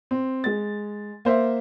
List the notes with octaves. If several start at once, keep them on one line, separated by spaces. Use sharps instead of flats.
C4
G#3 A6
A#3 C5 E5